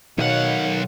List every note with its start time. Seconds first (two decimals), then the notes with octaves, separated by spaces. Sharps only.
0.18 B1 B2 D#3 C#5 F5 F#5